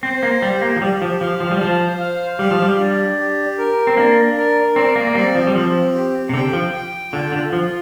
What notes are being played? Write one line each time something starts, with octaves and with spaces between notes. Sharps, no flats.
C4 C5
A#3
G3 G4
A#3
F3
G3 G4
F3
F3 F5
F3
G3
F3 C5
F5
G3 G4
F3
G3
D4
G4
A#4
C4
A#3 D4
A#4
C4 D5
A#3
A#3
G3 C4
F3
G3
F3 C4
G4
C3
D3 G5
F3
G5
D3 F4
D3
F3 F4